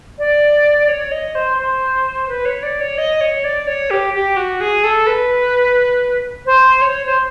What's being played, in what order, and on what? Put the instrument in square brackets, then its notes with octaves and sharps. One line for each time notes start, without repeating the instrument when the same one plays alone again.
[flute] D5
C#5
D#5
C5
C5
B4
C#5
D5
C#5
D#5
C#5
D5
C#5
G4
G4
F#4
G#4
A4
B4
C5
C#5
C5